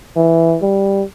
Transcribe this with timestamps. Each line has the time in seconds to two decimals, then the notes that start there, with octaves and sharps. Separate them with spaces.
0.16 E3
0.62 G3